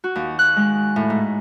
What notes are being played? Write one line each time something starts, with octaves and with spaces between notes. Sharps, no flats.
F#4
D#2
F#6
G#3
A2
G#2